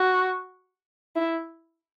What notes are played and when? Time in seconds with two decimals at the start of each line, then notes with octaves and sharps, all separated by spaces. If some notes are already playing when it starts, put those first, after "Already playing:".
Already playing: F#4
1.16 E4